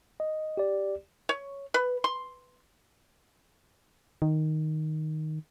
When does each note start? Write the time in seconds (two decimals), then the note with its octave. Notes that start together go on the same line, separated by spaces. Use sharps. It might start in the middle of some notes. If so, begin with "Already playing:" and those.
0.20 D#5
0.57 G4 D5
1.29 C#5
1.74 B4
2.04 C6
4.22 D#3